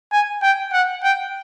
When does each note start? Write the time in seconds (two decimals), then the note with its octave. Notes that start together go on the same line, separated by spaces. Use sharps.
0.12 G#5
0.42 G5
0.73 F#5
1.03 G5